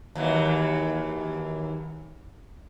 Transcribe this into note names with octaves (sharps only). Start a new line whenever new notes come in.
D#2 E3 F#3